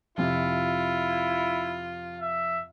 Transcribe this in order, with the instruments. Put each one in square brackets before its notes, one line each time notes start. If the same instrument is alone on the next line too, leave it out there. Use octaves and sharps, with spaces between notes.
[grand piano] F2 C3 F3 [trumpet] E4 [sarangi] F4
[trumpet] E5